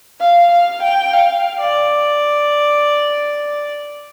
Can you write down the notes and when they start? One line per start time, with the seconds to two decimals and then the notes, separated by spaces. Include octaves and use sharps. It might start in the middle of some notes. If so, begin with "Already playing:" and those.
0.20 F5
0.51 F5
0.82 G5
1.13 F5
1.60 D5